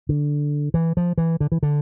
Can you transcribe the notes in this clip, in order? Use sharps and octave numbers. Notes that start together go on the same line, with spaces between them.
D3
E3
F3
E3
D3
E3
D3